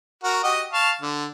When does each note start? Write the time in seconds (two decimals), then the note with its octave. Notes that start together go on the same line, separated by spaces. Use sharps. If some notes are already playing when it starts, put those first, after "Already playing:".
0.23 F#4 A#4
0.44 F#4 G4 D#5
0.73 F5 A5 C#6
1.01 D3